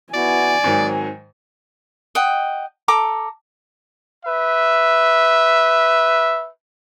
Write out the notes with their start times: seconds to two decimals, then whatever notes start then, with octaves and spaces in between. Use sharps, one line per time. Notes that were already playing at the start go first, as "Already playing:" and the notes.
0.14 B3 E4 F#4 D5 G#5
0.64 G#2 D#3 F#3 C4
2.15 D#5 F#5 G5
2.88 A4 A#5 D6
4.25 B4 E5